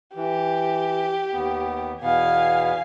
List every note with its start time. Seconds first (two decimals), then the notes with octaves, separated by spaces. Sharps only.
0.16 E3 G4
1.33 D#2 B3
2.02 E2 B2 B3 F5 G#5